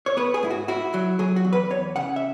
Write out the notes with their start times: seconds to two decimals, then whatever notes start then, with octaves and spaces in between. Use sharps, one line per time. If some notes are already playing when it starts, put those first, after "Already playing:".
0.06 C#5
0.17 B3 B4
0.34 G#4
0.43 G#2 E4
0.51 F#4
0.68 E4 F#4
0.94 F#3
1.19 F#3 G#4
1.36 F#4
1.45 E2
1.53 B4
1.70 E2 C#5
1.96 C#3 F#5
2.16 E5